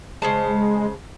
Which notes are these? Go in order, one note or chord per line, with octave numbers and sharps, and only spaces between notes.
C#3 G#3 C5 A5